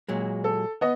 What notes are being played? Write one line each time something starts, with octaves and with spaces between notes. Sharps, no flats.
A#2 F#3 G#3
A4
B3 D#5